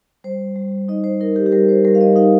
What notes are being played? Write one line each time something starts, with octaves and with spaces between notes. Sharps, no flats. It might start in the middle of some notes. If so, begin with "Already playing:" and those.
G3 C5
G3
D#4 D#5
C5
D#4 A#4
G4
G4
G3 A#4
C5
G3 A#4
F5
D#5
D#4 F5